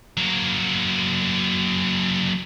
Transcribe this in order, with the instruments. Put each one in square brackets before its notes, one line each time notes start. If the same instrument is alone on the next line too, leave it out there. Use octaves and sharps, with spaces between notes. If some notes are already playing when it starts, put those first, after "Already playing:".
[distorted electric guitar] F#3 A#3